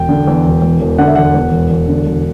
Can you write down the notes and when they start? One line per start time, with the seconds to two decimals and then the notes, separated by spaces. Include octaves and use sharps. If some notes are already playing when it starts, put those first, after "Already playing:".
Already playing: E1 G5
0.09 D3
0.27 E2
0.45 E1
0.62 E2
0.80 E1
0.98 D3 F#5
1.07 E5
1.15 E1 F#5
1.34 E2
1.52 E1
1.70 E1
1.88 D3
2.06 E1